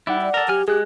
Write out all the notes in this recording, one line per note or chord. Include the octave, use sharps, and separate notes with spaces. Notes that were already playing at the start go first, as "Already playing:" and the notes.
G3 D#4 E4 F#5 D6
D5
A4 A#4
F#3 G4 G#5 F6
G#3 G4 G#4 F#6